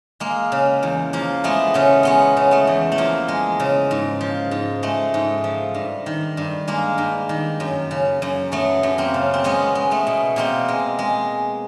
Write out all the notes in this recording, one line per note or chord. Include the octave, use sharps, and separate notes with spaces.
G#3 A#3
C#3
E2
F3 A#3
G#3 A3 B3
C#3 B3 C#4
G#3 B3 C#4
C#3
A3 B3
E2
A3
F3 A#3
G#3
C#3
G#2
F3
G#2
G#3 A3
G#2
F3
G2
D#3
G2
G#3 A#3
G2
D#3
F#2
C#3
F#2
F#3 A3 B3
F#2
A#3 C4
C#3
C4
G#3 B3 C#4
G#3
A3 B3
B2
B2 A#3 C4
G#3
G#3